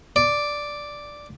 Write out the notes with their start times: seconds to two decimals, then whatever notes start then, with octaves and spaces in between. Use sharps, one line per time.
0.16 D5